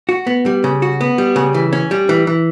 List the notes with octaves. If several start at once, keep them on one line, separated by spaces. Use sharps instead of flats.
F#4
B3
G3
C#3
F#4
B3
G3
C#3
E3
C#4
G3
E3
E3